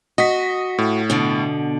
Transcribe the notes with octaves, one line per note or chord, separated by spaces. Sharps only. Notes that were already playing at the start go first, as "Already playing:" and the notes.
F#4 D#5 B6
A2
B2 D3